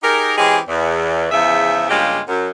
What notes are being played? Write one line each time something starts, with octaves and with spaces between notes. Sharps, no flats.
D#4 G4 G#4 A#4
E3 G#3 C4 C#4 G4 G#4
E2
E2 C#3 F3 G#4 E5
G2 C#3 G#3 A#3 F4 G4
F#2